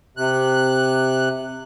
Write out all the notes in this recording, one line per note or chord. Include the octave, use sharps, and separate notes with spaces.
C3 F#6